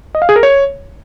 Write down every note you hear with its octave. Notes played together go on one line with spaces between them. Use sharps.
D#5
F5
G#4
A#4
C#5